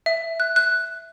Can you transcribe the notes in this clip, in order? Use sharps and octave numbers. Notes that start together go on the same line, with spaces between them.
E5
F#6
F#6